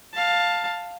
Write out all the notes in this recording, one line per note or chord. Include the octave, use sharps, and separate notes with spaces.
F5 A5